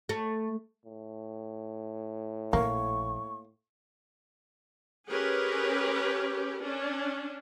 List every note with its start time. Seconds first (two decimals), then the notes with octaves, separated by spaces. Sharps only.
0.09 A3
0.85 A2
2.53 A#1 A#3 C#6
5.09 C#4 G4 G#4 A#4 B4
6.61 C#4 D4